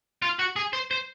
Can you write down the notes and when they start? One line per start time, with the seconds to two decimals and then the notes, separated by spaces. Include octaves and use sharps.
0.23 F4
0.39 F#4
0.56 G#4
0.73 C5
0.91 C5